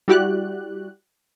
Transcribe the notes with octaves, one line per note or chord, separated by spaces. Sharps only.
G3 E4 F#4 G4 D5 F#6